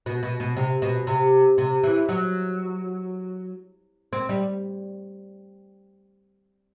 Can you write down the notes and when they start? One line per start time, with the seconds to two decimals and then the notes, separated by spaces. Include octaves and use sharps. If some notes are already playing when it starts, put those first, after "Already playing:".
0.06 B2
0.23 B2
0.40 B2
0.57 C3
0.82 B2
1.07 C3
1.58 C3
1.83 E3
2.09 F#3
4.13 C4
4.29 G3